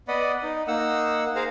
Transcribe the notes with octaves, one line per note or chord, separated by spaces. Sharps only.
B3 D5 D#5 F#5 B5
D#4
A#3 D#4 F#5 E6
G#4 A#4 C5 F5 A#5